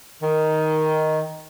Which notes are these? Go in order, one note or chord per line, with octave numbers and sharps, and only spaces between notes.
D#3